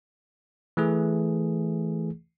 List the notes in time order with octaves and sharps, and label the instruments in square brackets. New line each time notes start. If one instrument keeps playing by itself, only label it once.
[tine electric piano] E3 A3 G#4